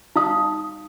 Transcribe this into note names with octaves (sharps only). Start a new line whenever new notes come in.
D#4 F5 D#6